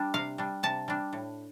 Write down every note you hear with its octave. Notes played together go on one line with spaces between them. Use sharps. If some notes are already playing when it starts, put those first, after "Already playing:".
Already playing: G3 D4
C3 F5
G3 D4
C3 A5
G3 D4
A2